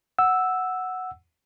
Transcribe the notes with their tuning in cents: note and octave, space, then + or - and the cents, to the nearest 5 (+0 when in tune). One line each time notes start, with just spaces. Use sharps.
F#5 +0 E6 +0